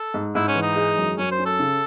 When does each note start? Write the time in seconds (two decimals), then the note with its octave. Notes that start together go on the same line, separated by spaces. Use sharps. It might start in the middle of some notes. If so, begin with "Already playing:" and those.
Already playing: A4
0.14 G#2
0.35 G#2 E4
0.48 C#4
0.55 E3
0.62 D#4
0.76 G#3
0.98 F#2
1.18 F#2 C#4
1.32 C5
1.39 C#4
1.46 A4
1.59 C#3